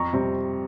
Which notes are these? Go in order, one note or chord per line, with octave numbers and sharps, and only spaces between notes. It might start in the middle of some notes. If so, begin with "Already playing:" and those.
Already playing: F2 A#5 C#6
C3 G3 C4